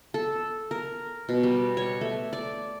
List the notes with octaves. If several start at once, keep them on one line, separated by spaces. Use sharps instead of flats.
A4
A#4
B2
G3
C#5
A3
D5